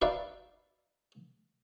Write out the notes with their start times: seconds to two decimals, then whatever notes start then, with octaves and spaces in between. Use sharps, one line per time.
0.02 D#4 F#4 B4 D5 E5 F5